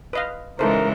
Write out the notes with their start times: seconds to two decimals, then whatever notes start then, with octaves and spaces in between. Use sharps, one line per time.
0.13 B4 D#5 F5
0.59 C#3 E3 G#3 D#4 A4 A#4 C5